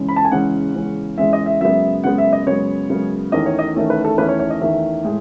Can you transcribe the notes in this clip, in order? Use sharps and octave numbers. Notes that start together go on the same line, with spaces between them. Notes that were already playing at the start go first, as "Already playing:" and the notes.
Already playing: E2 C#3 G#3 C#4
B5
A5
G#5
E2 C#3 G#3 C#4 F#5
E2 C#3 G#3 C#4
E2 C#3 G#3 C#4 E5
D#5
E5
F#2 C#3 G#3 B3 E5
F#2 C#3 G#3 B3 F#5
E5
D#5
F#2 C#3 G#3 B3 C#5
F#2 C#3 G#3 B3
E2 D#3 A3 C#4 D#5
C#5
D#5
E2 D#3 A3 C#4
B4
A4
E2 D#3 A3 C#4 B4
C#5
C#5
D#5
E2 D#3 A3 C#4 E5
A2 G#3